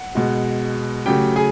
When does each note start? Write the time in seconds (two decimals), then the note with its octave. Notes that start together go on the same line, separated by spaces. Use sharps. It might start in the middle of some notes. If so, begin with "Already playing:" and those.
Already playing: F#5
0.15 B2 G#3
1.06 C#3 F#3 A3 G4 G5
1.36 G#4 G#5